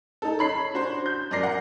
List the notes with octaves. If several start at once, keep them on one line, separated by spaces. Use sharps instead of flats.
D#4 A4
C#5 B5 C7
D4 F#4 C5
G6
F#2 A#4 D5 A#6 C7
F#5